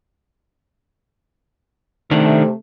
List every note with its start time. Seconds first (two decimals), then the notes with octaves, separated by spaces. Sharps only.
2.11 C3 D#3 A3 D4